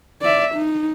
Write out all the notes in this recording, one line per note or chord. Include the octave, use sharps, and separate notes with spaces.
D5 E5
D#4